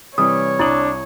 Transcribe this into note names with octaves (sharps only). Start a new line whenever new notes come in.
C3 E3 G3 C#5 D#6
C2 D4 E4 D#6 F#7